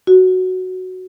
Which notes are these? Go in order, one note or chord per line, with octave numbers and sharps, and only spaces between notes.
F#4